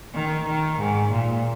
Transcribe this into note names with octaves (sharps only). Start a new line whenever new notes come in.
D#3
D#3
G#2
A#2